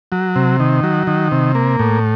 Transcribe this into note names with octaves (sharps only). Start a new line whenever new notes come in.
F#3
C3
D#3
F#3
D#3
C3
A#3
A2